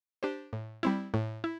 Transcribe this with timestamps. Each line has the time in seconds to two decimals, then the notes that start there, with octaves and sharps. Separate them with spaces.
0.23 D4 G4 C5
0.53 A2
0.83 G3 C4 E4
1.14 A2
1.44 E4